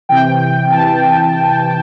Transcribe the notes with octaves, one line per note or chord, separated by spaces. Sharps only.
C3 E3 G5
C3 E3 A5